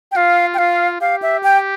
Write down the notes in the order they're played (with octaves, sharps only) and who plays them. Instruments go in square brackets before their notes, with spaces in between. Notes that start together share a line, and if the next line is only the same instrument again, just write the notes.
[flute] G5
[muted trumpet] F4 [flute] F5
[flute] G5
[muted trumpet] F4 [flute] F5
[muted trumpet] G4 [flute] F5
[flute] E5
G5